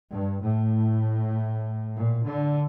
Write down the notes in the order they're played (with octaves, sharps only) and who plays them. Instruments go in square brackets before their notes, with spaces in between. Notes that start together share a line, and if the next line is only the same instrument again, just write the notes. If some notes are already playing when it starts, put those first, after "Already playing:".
[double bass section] G2
A2
A#2
D3